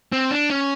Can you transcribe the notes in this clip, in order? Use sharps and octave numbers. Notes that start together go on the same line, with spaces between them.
C4
D4
C#4